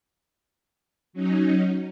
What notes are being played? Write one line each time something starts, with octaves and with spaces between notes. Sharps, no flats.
F#3 C#4 D#4